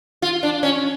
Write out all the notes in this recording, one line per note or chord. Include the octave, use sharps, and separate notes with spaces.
F4
D4
C#4